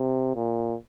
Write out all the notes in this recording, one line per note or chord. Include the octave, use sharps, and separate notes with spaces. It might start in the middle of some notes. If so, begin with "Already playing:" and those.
Already playing: C3
A#2